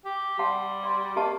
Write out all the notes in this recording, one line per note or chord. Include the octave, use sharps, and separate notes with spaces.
G4
G3 F#5 A5 C6
D5 C6
A#3 G4 D#5 A5